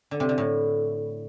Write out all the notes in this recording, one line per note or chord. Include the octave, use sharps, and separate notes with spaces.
D3
C3
D3
A2